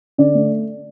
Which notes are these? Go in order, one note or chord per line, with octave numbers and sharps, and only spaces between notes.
D3 D5
A3